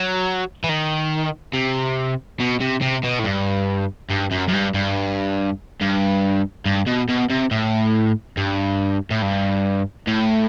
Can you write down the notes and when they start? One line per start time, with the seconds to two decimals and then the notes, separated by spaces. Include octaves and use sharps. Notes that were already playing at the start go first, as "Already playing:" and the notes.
Already playing: F#3
0.64 E3
0.69 D#3
1.54 C3
2.40 B2
2.61 C3
2.82 C3
3.04 B2
3.20 A2
3.24 G2
4.10 G2
4.32 F#2
4.48 F#2
4.53 G2
4.74 G2
5.81 G2
6.66 G2
6.87 B2
7.09 B2
7.30 C3
7.51 A2
8.37 G2
9.10 A2
9.22 G2
10.08 A2